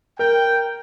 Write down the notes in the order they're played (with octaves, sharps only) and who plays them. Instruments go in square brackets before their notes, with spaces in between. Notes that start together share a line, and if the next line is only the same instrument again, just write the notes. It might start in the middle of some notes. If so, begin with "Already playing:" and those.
[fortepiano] A#4 [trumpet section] G5